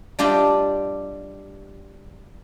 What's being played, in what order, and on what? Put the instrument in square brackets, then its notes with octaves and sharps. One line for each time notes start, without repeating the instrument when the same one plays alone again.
[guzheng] G3 D4 F4 G4 D5 D#5